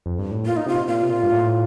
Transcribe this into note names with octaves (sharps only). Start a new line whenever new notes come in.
F2
G2
A2
A#2 F4
D#4
C3 F4
A#2 F4
C3
A#2
G2
A2